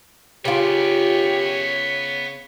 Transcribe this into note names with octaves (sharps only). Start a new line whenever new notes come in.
C#3 B3 F4 G4 C#5 D5